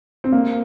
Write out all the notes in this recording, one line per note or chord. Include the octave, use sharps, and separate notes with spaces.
C4
A#3